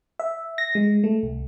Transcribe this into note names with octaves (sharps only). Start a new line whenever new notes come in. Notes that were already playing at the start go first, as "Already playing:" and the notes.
E5
A#6
G#3
A3
C2